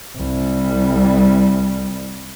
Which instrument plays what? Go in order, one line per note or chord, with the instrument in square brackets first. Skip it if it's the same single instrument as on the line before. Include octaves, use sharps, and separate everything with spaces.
[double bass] C2 G3